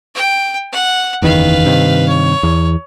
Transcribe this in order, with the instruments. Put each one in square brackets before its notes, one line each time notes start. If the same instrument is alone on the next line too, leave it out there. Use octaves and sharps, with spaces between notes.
[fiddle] G5
F#5
[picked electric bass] F#1 E2 D#3 [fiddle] B4 F5
[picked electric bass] G2 C3 D#3
[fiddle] C#5
[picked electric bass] E2